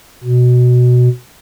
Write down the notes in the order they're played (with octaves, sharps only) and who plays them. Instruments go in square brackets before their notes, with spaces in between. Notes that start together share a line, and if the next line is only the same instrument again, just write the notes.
[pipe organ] B2